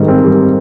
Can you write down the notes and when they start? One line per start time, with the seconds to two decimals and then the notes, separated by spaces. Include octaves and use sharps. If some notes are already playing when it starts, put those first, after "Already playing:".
Already playing: G#2 D#3 G3
0.08 C4
0.24 G3